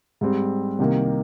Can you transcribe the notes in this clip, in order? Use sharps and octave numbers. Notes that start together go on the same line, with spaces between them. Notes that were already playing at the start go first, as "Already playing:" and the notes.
G#2 G3 C4
C2 C3 D#3 A#3